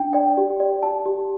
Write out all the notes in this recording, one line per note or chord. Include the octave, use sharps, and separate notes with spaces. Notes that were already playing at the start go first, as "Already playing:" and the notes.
Already playing: D4 G5
D5 G5
G4
D5
G4 A5
G4